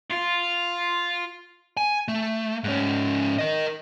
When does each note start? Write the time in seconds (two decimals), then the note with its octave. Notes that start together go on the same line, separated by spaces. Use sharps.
0.10 F4
1.77 G#5
2.08 A3
2.64 G#2 C#4
3.39 A#4 D#5